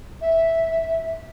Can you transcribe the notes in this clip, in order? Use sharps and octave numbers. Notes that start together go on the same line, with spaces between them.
E5